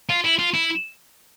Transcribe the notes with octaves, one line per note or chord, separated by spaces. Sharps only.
F4
E4
F4
E4